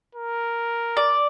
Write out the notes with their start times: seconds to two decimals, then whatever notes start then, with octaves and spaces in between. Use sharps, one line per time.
0.15 A#4
0.97 D5